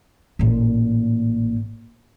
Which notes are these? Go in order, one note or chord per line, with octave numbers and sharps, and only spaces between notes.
A1 A#2